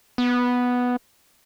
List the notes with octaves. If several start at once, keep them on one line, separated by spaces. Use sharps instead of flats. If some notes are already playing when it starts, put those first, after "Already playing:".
B3